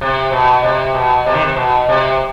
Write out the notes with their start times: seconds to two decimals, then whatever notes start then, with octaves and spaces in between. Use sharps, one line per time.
0.01 C3
0.32 B2
0.63 C3
0.95 B2
1.26 C3
1.34 D#3
1.41 C3
1.56 B2
1.89 C3